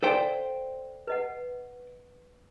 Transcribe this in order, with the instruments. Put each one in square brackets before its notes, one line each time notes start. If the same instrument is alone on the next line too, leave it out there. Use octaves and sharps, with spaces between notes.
[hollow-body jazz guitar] A4 C5 G5 [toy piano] D5 F5
[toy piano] B4 D#5 F#5